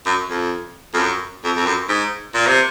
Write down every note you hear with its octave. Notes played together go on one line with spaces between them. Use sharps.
F#2
F2
F2
F#2
F2
F2
F#2
G#2
A#2
C3